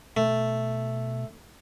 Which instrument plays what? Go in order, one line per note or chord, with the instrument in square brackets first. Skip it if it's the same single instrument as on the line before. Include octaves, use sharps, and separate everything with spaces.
[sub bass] B2 [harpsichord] A3